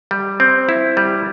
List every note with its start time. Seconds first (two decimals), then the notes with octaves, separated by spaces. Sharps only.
0.11 G3
0.40 C4
0.69 E4
0.97 G3